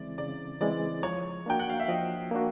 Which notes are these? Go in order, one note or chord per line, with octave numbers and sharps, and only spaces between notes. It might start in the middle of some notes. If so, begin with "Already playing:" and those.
Already playing: C#3 E3 G#3 C4 E4 D5
C#3 D5
E3 G#3 C4 E4 D5
F3 C#5
A#3 D4 F#4 G5
F#5
F5
E5
F3 D#5
A#3 D4 F#4